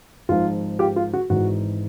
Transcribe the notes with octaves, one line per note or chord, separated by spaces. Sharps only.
G#1 G#2 F3 F4
F4 G4
F4
F#4
G#1 G#2 E3 F#4